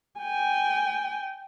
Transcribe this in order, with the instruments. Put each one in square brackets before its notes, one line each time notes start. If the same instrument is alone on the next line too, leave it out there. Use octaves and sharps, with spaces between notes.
[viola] G5 G#5